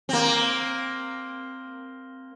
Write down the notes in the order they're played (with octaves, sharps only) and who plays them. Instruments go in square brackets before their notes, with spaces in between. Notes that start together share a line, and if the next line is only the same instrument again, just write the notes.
[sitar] A#3 C4